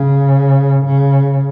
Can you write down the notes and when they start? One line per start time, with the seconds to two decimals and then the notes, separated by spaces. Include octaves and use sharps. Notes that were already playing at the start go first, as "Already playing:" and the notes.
Already playing: C#3
0.86 C#3